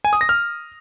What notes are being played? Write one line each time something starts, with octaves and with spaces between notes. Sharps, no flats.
G#5
D#6
A#6
F6